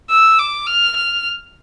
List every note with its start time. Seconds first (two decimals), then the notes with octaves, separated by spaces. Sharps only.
0.10 E6
0.39 D6
0.67 F6
0.96 F6